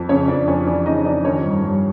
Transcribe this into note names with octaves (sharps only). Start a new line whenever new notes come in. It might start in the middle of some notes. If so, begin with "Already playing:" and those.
Already playing: F2
C#3 C#4 C#5
F2 D4 D5
F2 C#4 C#5
E3 D4 D5
C#3 D#4 D#5
F2 D4 D5
D#3 C#4 C#5
G2
G2